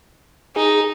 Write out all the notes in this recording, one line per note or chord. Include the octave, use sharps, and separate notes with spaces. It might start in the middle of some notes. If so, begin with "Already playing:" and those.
D#4 G#4